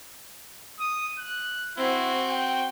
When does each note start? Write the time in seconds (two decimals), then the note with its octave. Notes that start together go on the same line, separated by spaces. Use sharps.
0.80 D#6
1.19 F#6
1.77 C4 E4 F#4
2.30 G5